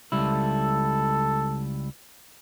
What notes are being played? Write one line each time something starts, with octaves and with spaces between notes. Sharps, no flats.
C#2 G3 E4 A4